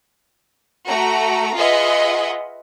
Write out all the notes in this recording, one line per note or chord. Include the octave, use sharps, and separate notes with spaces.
A3 F#4 A#5
F4 G#4 B4 D#5 E5 F#5